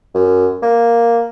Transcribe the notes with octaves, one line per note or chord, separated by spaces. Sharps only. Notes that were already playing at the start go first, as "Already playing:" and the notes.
F#2
A#3